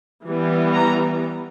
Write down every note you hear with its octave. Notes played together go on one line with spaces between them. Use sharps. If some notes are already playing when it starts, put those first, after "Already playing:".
E3 G3 B3
A#5